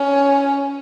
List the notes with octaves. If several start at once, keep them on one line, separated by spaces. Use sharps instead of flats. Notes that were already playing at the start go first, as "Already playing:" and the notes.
Already playing: C#4